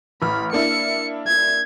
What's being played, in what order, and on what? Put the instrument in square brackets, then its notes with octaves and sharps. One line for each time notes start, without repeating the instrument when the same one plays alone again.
[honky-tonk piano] A1 F6 [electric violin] B5
[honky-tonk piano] A#3 D4 E4 [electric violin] C#7
[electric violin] G#6